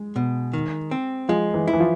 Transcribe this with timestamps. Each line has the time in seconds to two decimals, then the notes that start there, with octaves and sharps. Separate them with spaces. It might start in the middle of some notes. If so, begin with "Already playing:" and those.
Already playing: G#3
0.16 B2
0.53 D#3
0.91 C4
1.29 F3 G#3
1.54 E3
1.68 E4
1.73 E3
1.80 F3